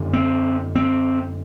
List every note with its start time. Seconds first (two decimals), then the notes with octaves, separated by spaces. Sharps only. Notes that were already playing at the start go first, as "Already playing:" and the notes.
Already playing: F#2 D3
0.13 C4
0.75 C4